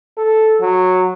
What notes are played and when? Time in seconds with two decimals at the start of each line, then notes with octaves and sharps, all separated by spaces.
0.18 A4
0.61 F#3